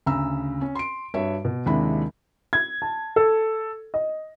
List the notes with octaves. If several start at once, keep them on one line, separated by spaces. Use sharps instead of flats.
D2 C#3 A#5 B5 E6
C#4
C6 D7
G2 F#4 C#5 E5
B2
D#2 C3 G#3 D4 E4 B5
G#6
A5
A4
D#5